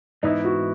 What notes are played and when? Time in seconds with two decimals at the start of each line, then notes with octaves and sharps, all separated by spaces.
0.23 G#2 E3 B3 D#4 E4
0.45 F#4